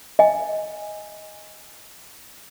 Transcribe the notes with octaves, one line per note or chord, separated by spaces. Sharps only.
D#5 G#5